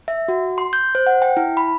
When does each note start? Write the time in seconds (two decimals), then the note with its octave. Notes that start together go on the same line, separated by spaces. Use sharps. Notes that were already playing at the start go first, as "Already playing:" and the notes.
0.08 E5
0.28 F#4
0.58 C6
0.73 G6
0.95 C5
1.07 F#5
1.22 G5
1.37 E4
1.57 B5